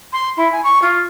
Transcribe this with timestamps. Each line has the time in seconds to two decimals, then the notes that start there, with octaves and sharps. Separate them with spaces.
0.12 C6
0.37 E4
0.52 G#5
0.64 C#6
0.82 F4